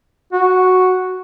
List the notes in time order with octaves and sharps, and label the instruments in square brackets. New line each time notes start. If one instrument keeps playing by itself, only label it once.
[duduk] F#4